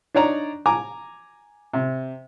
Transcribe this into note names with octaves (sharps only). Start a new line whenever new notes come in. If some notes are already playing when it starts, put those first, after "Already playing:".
D4 D#4 C#5 D5 A#5
G#5 A#5 D6
C3